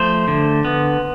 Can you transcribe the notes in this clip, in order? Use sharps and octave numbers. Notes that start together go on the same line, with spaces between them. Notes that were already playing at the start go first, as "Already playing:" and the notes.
Already playing: F3 A3 C5
D3
B3